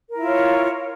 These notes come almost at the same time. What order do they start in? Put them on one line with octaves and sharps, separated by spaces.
A#4 E4 F4 C#5